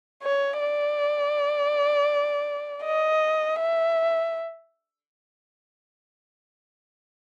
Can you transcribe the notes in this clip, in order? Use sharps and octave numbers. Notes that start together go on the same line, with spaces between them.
C#5
D5
D#5
E5